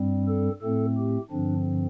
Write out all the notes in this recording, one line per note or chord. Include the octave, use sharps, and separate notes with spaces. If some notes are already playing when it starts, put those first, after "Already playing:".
Already playing: G2 G3 C4
A4
A2 A3 C4 A4
G4
G2 D3 F3 C4 D4